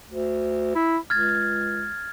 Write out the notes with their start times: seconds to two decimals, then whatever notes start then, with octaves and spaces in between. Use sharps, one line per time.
0.09 D2
0.75 E4
1.10 C#2 F6 G#6 A6